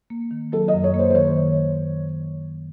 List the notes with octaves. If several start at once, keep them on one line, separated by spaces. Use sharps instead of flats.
A#3
D#3
F#3 A4
D#5
F#2
C#5
A#3
C5
C5
D#3 C#5